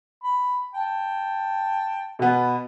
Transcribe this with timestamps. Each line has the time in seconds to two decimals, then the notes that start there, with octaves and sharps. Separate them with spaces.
0.24 B5
0.74 G5 A5
2.19 B2 B3